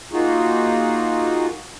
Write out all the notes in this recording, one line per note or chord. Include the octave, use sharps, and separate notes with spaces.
A#3 D#4 F4 F#4 G#4